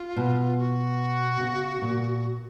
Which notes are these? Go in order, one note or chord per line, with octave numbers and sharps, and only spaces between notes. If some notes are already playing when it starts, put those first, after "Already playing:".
Already playing: F4
B2
F#4
C#3
A#2